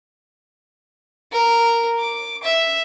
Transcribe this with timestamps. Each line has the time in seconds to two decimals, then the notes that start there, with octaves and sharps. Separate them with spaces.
1.32 A#4
1.99 D6
2.43 E5